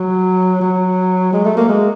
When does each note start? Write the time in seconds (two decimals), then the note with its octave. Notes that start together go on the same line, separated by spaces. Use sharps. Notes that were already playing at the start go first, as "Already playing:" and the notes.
Already playing: F#3
0.61 F#3
1.33 G#3
1.45 A3
1.57 A#3
1.69 G#3